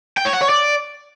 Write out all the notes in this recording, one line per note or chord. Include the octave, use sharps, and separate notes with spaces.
G5
C#5
F#5
C#5
D5